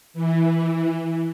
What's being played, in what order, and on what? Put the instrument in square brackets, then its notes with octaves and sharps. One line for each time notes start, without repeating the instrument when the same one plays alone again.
[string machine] E3